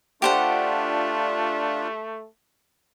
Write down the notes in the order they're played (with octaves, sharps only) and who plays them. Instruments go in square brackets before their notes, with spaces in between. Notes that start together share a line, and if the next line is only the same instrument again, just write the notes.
[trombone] A3 [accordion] D4 F4 [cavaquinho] G4 C5 F#5